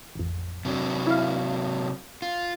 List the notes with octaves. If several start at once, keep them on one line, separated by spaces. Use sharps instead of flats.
A1 F2
C3 F#3 D4
E4 F5
F4